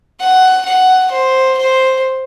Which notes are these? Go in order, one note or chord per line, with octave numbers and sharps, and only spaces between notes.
F#5
F#5
C5
C5